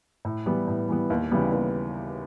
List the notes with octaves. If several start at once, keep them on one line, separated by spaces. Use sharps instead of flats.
A2
E3 G3 B3
A2
E3 G3 B3
D#2
C#3 E3 G3 B3
D#2